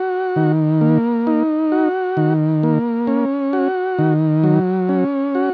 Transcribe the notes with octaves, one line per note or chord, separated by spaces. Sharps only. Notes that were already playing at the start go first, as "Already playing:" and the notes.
Already playing: F#4
D#3
A#3
D#4
F#4
D#3
A#3
C#4
F#4
D#3
F#3
C#4
F#4